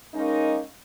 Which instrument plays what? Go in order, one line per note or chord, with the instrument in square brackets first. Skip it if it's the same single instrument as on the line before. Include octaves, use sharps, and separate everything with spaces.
[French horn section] D#3 G#3 A#3 C#4 D#4